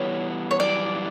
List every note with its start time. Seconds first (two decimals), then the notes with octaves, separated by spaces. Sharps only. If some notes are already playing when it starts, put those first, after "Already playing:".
Already playing: E3 G3 B3 C#5
0.51 C#5
0.60 F#2 E3 G3 D5